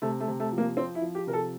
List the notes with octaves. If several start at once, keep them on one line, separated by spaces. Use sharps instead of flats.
C3 A3
A3
C3
A3
F3
A#3
F3 C4
E4
F3
G4
C3 A#4
A4